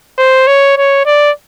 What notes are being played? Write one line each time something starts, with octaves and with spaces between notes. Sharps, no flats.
C5
C#5
C#5
D5